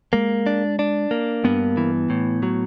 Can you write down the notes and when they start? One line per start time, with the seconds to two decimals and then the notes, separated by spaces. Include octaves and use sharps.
0.13 G#3 A#3
0.46 D4
0.79 D4
1.11 A#3
1.44 G2 B3
1.77 E3
2.10 A2
2.43 F#3